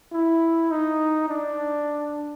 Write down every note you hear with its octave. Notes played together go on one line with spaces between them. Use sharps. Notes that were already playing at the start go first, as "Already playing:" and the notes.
E4
D#4
D4